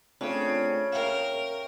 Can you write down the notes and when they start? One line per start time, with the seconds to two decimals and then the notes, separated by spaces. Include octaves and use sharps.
0.21 C#3 A3 C4 D4 F4 G#4
0.92 A#4 E5 F5 G5